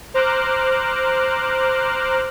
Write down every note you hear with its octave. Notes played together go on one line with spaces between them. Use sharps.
C5 A#5 D6 F6 F#6